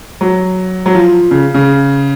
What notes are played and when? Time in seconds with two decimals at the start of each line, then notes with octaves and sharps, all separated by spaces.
0.21 F#3
0.86 F#3
0.95 F3
1.31 C#3
1.54 C#3